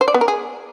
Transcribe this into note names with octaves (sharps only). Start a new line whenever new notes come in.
C5
D5
B3
A#4
G#4